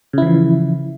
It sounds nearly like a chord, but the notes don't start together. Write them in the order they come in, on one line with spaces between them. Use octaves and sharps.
C#3 E4 E3 F3